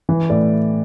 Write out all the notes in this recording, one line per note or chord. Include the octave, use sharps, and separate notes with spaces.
E3
A2 D5